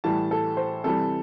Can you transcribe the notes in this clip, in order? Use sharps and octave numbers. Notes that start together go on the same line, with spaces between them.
A2 E3 G3 A5
A4
C5
C3 E3 G3 A4